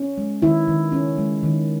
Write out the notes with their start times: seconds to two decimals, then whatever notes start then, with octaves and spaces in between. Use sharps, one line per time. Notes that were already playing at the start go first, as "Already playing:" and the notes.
Already playing: C#4
0.18 G#3
0.42 D#3 E4
0.68 D#3
0.92 C#4
1.18 G#3
1.43 D#3